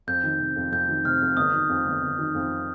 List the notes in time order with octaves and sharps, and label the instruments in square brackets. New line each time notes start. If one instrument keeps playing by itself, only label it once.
[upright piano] F2 [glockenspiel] G6
[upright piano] D#3
C3
F2
[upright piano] F2 [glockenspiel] G6
[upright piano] D#3
[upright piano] C3 [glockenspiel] F6
[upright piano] F2
[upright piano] G1 [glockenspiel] D#6
[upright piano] D#3
F2
G1
G1
D#3
F2